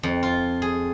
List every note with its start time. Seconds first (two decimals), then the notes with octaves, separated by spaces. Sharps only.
0.03 F2
0.23 F4
0.62 G#4